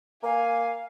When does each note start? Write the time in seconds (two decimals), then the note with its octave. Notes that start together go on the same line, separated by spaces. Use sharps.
0.23 A#3 F5 G#5